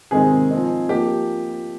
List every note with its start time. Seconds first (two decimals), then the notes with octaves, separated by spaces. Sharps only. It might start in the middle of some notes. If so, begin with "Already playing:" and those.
0.11 C3 D#3 G#3 C4 G#4
0.51 F3 C4 D#4
0.89 F3 A#3 D#4 G4